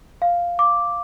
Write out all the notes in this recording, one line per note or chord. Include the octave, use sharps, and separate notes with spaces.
F5
D6